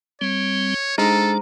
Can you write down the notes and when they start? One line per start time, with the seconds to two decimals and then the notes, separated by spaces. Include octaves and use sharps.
0.21 G3 C4 C#5
0.98 G#3 D4 D#4 A4 C5 A#5 F6